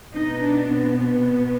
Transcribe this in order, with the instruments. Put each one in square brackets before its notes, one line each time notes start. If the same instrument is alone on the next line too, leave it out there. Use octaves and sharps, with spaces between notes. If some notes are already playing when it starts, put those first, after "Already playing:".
[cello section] B2 B3 D#4
D4
C4